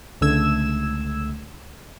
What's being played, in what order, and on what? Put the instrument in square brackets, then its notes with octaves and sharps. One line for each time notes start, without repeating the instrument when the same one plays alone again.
[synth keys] C#2 D3 A3 E6 G#6 E7